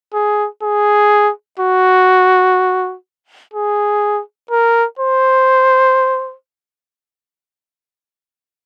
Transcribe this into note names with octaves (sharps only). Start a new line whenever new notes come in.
G#4
G#4
F#4
G#4
A#4
C5